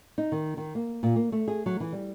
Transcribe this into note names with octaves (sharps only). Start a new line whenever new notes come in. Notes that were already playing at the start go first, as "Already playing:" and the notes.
D#4
D#3
D#3
A#3
A#2
A#3
A3
G#4
F#3
E3
G3